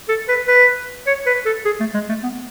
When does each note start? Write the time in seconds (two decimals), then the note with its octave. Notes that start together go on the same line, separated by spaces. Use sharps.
0.09 A4
0.28 B4
0.48 B4
1.07 C#5
1.26 B4
1.46 A4
1.65 G#4
1.80 A3
1.94 G#3
2.09 A3
2.23 B3